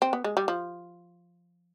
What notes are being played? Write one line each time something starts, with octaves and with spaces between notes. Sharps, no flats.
C4
B3
G#3
G3
F3